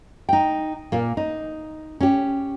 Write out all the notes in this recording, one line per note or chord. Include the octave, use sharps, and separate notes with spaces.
D#4 G5
A#2 A#3
D#4
C#4 G4